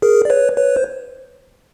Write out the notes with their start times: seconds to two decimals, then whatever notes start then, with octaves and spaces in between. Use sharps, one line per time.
0.02 G#4 A#4
0.25 D5
0.30 B4 C#5
0.57 B4 C#5
0.77 C5